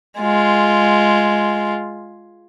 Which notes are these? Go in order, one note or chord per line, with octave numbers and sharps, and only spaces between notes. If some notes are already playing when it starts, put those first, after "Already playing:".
G#3 F4